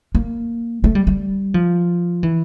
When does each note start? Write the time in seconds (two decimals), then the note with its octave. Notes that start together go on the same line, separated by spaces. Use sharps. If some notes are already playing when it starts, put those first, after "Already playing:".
0.15 A#3
0.84 A3
0.95 G3
1.07 G3
1.54 F3
2.23 E3